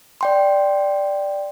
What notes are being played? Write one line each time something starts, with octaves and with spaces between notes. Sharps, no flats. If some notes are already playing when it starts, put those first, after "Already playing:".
D5 G5 C6